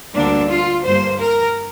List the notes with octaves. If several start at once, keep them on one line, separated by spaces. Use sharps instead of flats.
D2 D3 G3 A#3 D4
F4
G2 G3 A#3 C5
A#4